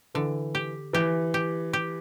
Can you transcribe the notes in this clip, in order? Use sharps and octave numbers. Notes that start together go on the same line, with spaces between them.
D3 E3
G4
E3 G4
G4
G4